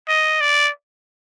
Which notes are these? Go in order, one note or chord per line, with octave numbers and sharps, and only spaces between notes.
D#5
D5